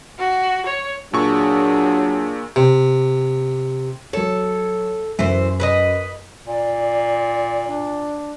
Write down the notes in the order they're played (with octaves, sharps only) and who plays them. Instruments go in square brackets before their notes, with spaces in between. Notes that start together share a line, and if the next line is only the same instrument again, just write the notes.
[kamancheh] F#4
C#5
[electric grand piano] A#2 C#6 [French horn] F#3 [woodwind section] D4 G#4
[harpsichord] C3
[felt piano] F#3 C#5 [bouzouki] A4
[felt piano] F#2 [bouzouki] E3 C5
[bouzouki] B4 C5 D#5
[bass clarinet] A#2 [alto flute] D5
[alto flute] D4